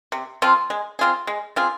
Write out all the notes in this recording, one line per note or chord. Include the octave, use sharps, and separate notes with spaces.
C3
F3 C4 F4
G#3
C4 F4 G#4
G#3
C4 F4 G#4